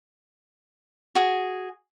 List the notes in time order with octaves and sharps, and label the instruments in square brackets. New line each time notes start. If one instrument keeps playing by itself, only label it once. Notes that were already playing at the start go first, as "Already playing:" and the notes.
[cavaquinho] F#4 G#4